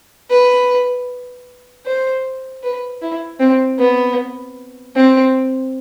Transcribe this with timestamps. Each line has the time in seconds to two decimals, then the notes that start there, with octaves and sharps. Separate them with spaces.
0.30 B4
1.86 C5
2.63 B4
3.02 E4
3.40 C4
3.79 B3
4.96 C4